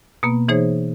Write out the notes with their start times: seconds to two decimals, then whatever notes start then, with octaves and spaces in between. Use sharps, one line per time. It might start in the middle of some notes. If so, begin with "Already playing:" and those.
0.23 B2 A#3 B3
0.49 E3 D#4 G#4 C5 C#5